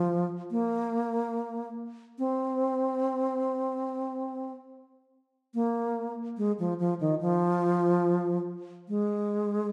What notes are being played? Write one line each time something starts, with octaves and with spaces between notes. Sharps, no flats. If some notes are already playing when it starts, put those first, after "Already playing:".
Already playing: F3
A#3
C4
A#3
G#3
F3
F3
D#3
F3
G#3